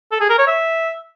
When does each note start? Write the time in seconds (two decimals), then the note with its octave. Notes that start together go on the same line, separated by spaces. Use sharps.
0.12 A4
0.21 G#4
0.30 A#4
0.39 C#5
0.47 E5